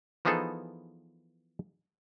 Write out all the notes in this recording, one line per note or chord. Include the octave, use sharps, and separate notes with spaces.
E3 F3 B3 D#4 G#4 A4